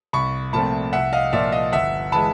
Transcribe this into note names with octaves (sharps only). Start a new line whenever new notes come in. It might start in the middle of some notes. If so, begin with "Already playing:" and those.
C2 B5 C#6
A#2 F3 A3 C4 A5 B5
C2 E5 F#5
D#5 F5
A#2 F3 D5 E5
D#5 F5
G1 E5 F#5
E3 G#3 A5 B5